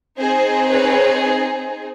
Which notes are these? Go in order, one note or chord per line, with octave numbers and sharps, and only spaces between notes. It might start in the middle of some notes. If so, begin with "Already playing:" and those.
C4 D#4 G#4 C5
B4 C#5